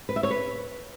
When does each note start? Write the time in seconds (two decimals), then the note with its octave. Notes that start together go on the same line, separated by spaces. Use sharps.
0.09 B4
0.16 E5
0.23 C#5
0.31 B4